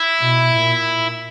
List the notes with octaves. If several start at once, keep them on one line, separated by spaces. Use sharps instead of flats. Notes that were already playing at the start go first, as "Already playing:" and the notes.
Already playing: E4
B2
A#2